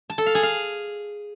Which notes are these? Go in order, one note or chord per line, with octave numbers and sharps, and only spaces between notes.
A5
A4
F5
G#4
F5